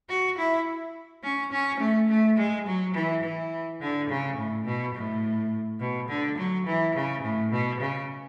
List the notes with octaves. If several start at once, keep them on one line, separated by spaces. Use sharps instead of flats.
F#4
E4
C#4
C#4
A3
A3
G#3
F#3
E3
E3
D3
C#3
A2
B2
A2
B2
D3
F#3
E3
C#3
A2
B2
C#3